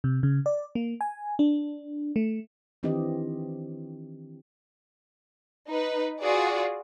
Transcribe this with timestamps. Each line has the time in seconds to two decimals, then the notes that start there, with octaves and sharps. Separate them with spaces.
0.04 C3
0.23 C#3
0.46 D5
0.75 A#3
1.01 G#5
1.39 D4
2.16 A3
2.83 D#3 E3 C4 D4 G4 D#5
5.69 D#4 B4
6.22 F4 F#4 G#4 D5